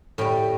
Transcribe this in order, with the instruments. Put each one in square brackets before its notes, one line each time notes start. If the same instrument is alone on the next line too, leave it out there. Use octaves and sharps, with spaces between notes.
[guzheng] A2 G3 G5